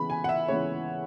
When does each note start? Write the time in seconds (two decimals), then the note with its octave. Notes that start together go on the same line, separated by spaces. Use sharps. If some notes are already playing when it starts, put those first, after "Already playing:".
Already playing: C#3 E3 G#3 B3 B5
0.10 G#5
0.24 F#5
0.29 E5
0.48 C#3 E3 G#3 B3 C#5